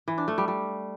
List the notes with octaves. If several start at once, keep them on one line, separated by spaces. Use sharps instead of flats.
E3
D4
A3
G3
G3